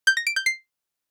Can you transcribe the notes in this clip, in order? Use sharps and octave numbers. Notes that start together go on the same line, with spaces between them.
G6
A#6
D7
G6
C7